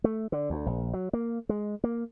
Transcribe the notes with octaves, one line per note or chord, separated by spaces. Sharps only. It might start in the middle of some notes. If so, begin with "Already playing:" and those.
A3
D3
D2
A#1
F#3
A#3
G#3
A#3